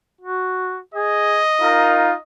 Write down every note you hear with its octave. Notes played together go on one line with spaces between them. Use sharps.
F#4
G#4 D#5
D#4 F4 A#4